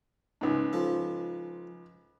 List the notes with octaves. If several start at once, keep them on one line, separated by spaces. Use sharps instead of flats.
C#2 G#2
F3 A4